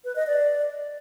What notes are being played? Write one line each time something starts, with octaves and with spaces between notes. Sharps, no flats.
B4
D#5
D5